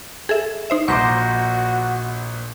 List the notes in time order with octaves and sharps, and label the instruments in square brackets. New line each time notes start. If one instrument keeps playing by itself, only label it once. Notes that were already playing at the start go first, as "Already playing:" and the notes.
[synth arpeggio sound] G#4 A4 E5
D#4 C5 E5
[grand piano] A#1 A#2 D6 [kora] D#4 C5 [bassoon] F#4 [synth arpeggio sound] C#6 B6